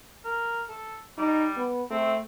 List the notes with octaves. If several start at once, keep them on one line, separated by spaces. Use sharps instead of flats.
A#4
A4
G3 D#4
B3
A3 C4